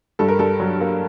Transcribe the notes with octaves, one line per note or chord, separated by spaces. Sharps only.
G2 A4
A#4
G2 A4
F#3
A#3